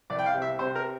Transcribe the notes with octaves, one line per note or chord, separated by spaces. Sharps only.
C2 D5
G5
F5
C3
E5
C3 C5
A#4